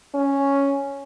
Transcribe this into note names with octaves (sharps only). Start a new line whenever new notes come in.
C#4